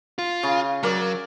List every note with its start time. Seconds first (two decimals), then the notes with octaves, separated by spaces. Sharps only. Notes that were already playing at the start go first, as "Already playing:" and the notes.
0.19 F4
0.43 C#3
0.83 F#3 A#4 D5